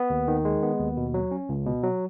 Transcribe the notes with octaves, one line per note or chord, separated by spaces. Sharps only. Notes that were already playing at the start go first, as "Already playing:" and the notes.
Already playing: B3
D#2
D#3
G#3
B3
D#2
B2
F#3
C#4
C#2
B2
F#3